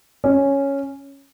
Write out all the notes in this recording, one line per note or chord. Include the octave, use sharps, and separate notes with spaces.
C#4